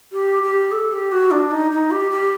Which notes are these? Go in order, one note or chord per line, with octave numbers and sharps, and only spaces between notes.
G4
G4
A4
G4
F#4
D4
D#4
D#4
G4
G4